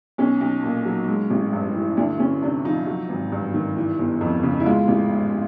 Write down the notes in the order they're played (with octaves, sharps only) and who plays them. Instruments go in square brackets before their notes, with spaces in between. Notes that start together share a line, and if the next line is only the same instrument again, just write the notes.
[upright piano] B1 C#4
B1
A#2
F#3
G#3
A1
G2
E3
D2 D4
D2 C#4
C3 D4
F3 D#4
F#3
G#1
G2
D#3
E3
G1
F2
C#3
E4
G#3 F4
A1
G#2